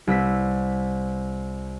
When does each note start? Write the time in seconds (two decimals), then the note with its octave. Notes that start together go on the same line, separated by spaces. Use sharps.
0.07 C2 B4 E6 B6